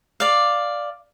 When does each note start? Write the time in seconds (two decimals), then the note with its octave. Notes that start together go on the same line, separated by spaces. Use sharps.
0.20 D5 F5